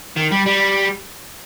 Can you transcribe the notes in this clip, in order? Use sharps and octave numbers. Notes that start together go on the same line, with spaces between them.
D#3
G3
G3